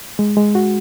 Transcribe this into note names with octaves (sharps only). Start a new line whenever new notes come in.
G#3
G#3
F#4